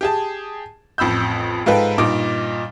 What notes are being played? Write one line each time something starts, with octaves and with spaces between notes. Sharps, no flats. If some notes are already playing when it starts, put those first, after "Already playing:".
G4 G#4 A5
A1 F2 B5 E6 G6
G#2 F4 A4 B4 G5
G2 A#2 D#4 D6 D7